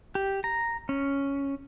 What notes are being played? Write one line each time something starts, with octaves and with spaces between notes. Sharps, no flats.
G4
A#5
C#4